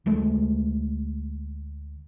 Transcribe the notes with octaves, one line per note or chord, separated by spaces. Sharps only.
D2 G#3 A3